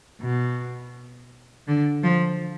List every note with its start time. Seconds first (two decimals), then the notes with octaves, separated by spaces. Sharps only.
0.21 B2
1.68 D3
2.03 F3